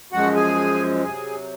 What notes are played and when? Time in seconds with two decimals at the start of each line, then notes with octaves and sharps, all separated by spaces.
0.12 F#2 F3 G#3 F#4 F#5
0.35 G#4 G#5
1.04 C3 F#3 G#4 G#5